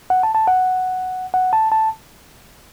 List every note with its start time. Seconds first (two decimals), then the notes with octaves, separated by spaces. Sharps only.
0.10 F#5
0.23 A5
0.35 A5
0.47 F#5
1.34 F#5
1.53 A5
1.72 A5